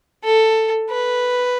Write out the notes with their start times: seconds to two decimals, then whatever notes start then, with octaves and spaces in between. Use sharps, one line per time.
0.24 A4
0.90 B4